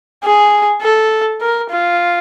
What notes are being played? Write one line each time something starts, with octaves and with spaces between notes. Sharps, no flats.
G#4
A4
A#4
F4